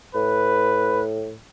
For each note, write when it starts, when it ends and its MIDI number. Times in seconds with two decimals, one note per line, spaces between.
0.15 1.36 45
0.15 1.02 71